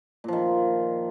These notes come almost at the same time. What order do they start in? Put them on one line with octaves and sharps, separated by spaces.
A#2 F3 D#3